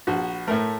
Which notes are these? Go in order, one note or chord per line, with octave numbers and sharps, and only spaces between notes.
A#1 F#4
A2 A3 A#4